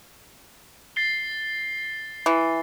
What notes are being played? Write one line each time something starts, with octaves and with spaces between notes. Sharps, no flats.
A6 C7 G7
E3